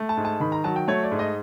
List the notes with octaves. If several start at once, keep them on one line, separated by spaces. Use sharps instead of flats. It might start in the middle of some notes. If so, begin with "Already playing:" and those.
Already playing: A3
A5
G#2
A5
D#3 B5
A#5
F#3 A5
G5
A3 C#5
D5
G#2
D#5